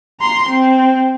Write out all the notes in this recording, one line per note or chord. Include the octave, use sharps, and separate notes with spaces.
A#5 C6
C4